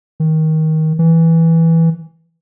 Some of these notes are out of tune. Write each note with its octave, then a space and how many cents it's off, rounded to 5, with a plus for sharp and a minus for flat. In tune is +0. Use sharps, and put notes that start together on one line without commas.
D#3 +20
E3 -5